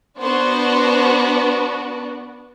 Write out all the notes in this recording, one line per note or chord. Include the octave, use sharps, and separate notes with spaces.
B3 D4 F#4 C5